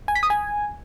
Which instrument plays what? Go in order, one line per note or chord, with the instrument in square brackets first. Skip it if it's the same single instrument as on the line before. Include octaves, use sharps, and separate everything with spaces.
[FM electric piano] G#5
B6
D#6
G#5